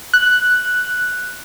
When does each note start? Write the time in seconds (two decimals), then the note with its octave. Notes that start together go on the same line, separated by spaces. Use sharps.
0.14 F#6